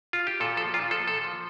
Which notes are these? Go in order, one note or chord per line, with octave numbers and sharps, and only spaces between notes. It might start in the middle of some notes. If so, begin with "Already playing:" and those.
F4
G4
A#2 A4
F3 A4
A#2 F4
F3 A4
A#2 A4
F3